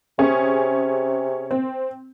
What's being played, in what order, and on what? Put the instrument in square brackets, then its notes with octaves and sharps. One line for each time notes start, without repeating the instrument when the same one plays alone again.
[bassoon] C3 [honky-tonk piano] C#4 G#4
[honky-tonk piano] C4